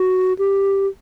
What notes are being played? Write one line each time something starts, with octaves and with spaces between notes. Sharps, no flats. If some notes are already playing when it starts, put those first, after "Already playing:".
Already playing: F#4
G4